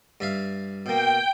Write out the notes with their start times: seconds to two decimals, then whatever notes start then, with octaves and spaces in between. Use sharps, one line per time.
0.20 G2 E5 F5
0.86 B2 A#3 G5